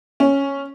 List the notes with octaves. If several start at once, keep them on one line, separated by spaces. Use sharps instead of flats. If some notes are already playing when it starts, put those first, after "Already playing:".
C#4